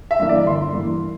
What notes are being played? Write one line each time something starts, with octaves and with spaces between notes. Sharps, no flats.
E5
G2 E3 A#3
D5
G1 C6
G2 E3 A#3